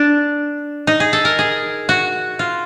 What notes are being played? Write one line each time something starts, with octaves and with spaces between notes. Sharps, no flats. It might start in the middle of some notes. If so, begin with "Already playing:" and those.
Already playing: D4
D#4
G#4
A4
A#4
G#4
F#4
F4